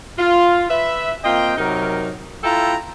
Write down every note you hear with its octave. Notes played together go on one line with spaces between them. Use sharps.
F4
B4 E5
A#3 C4 F4 D#5 G5
C3 F#3 D#4 A#4
E4 F4 A4 E5 G5 A#5